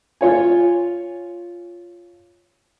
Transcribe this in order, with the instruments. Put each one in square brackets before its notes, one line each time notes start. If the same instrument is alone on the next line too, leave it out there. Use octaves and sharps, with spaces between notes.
[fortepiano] F4 C#5 G#5